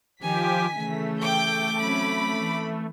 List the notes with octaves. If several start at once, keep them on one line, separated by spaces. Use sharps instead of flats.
D#3 F3 G4 G#5 B6
C#3 E3 A3
G5 D6 G6
F#3 C4 C#4 B5
E3